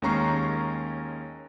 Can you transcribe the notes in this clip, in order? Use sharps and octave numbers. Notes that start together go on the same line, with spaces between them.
D#2 G#3 C#4 A#5 C#6 C7